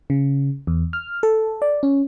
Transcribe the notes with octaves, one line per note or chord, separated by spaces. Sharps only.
C#3
E2
F6
A4
D5
C#4